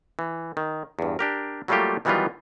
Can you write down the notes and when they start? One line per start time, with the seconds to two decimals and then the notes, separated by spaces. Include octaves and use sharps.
0.19 E3
0.57 D#3
0.99 E2 G2
1.19 D4 G4 A#4
1.68 F#3 G3 A3 A#3 F4 G4
2.05 D#3 E3 F#3 G3 B3 F4